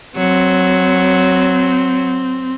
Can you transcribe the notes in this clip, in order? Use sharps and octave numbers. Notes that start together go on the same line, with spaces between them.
F#3 C4